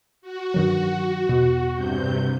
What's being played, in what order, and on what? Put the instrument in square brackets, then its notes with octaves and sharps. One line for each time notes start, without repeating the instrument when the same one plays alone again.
[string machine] F#4
[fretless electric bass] G2 D#3 F#3
E2 B2
[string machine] G2 C3 G6